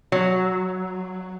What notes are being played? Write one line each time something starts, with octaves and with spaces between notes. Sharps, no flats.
F#3